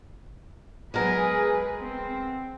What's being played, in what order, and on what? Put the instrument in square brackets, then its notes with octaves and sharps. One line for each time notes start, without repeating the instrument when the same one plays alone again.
[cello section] F#3 G#4 B4 [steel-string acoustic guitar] G#3 B3 A#4
[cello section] C4